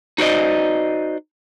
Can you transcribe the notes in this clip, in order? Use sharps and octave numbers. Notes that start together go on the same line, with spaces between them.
D#4 F#4 C5 D5 D#5